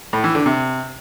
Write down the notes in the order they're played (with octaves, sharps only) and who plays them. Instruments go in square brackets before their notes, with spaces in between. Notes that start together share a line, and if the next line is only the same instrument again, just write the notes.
[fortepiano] A2
E3
D3
C3